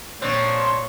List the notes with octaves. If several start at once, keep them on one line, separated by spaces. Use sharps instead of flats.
A#2 F3 C4 D4 C#5